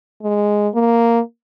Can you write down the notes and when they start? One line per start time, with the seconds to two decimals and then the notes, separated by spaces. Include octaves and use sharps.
0.23 G#3
0.75 A#3